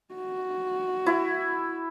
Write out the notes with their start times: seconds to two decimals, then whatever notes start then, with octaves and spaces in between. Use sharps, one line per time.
0.14 F#4
1.06 E4